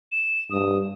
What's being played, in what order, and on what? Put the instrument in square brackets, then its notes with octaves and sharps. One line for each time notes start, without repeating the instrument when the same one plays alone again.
[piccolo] E7
[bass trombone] G2 [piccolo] D#6